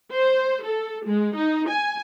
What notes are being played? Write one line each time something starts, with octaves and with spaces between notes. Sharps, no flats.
C5
A4
G#3
D#4
G#5